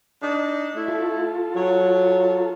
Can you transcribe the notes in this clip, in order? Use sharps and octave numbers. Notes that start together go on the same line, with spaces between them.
D4 D#4 D#5
A3 E4
F4 A4
F#3 C#5